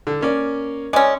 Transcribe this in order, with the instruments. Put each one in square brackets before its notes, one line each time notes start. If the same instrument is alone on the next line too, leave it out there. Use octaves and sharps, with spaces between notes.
[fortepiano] D3
A#3 C#4 D5
[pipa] G#3 C#4 [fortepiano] D5